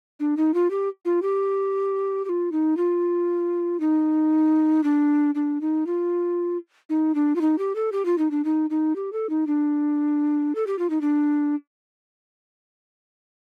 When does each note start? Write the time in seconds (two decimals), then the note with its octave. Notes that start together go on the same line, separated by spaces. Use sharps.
0.20 D4
0.37 D#4
0.54 F4
0.71 G4
1.05 F4
1.22 G4
2.25 G4
2.29 F4
2.52 D#4
2.77 F4
3.80 D#4
4.84 D4
5.35 D4
5.61 D#4
5.87 F4
6.89 D#4
7.15 D4
7.36 F4
7.41 D#4
7.58 G4
7.76 A4
7.92 G4
8.05 F4
8.18 D#4
8.31 D4
8.45 D#4
8.70 D#4
8.96 G4
9.13 A4
9.30 D#4
9.47 D4
10.55 A4
10.67 G4
10.79 F4
10.90 D#4
11.01 D4